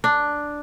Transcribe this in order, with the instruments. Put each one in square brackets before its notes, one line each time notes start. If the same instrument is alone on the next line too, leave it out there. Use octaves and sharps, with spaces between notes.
[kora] D4